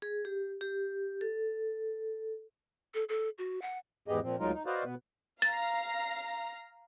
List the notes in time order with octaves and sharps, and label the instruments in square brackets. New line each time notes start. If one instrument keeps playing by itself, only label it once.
[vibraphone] G#4
G4
G4
A4
[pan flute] A4
A4
F#4
F#5
[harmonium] E2 G#2 B3 G4 G#4 D#5
A#2 F3 C4
D2 F#3 G#3 D#4 F4 A#4
D#4
F#4 B4 C5 D5 D#5 F5
B2 B3 B4
[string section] F5 A#5 [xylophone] A6